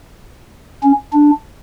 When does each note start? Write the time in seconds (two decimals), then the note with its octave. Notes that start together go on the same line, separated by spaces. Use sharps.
0.83 C#4
1.13 D4